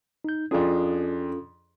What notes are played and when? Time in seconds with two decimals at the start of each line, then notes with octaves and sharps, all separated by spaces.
0.24 D#4 G6
0.51 F2 C#4 D4 F4 G#4 A4